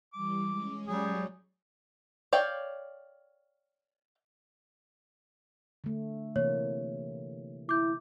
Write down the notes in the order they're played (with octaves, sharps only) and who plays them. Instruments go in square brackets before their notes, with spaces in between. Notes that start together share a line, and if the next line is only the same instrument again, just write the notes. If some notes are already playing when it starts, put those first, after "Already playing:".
[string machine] E3 G3 [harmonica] D6
[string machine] G#3 C#4
[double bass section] F#3 [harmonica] G3 G#4
[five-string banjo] C#5 D5 F5 G5
[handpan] D3 A3
[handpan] C3 E3 A#3 [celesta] C#5
[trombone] E4 [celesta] D6 G6